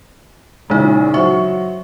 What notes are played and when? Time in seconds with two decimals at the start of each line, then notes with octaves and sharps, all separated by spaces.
0.70 A#1 C#3 E3 G#3 D#4
1.14 F#3 C5 E5 C#6